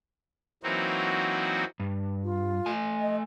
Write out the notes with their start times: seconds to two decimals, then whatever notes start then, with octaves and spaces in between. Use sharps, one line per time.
0.63 E3 F#3 A#3 C4 D#4 F#4
1.80 G2
2.24 F4
2.66 A3 G#5
3.00 D#5